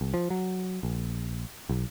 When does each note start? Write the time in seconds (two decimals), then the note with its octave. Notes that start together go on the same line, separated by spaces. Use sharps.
0.01 C2
0.14 F3
0.30 F#3
0.83 A#1
1.69 B1